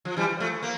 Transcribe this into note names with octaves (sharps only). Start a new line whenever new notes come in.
F3
E3 G3
F3 A3
A#3